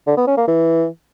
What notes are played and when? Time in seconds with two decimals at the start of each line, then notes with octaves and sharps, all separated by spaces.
0.07 D3
0.17 B3
0.27 C#4
0.38 A#3
0.48 E3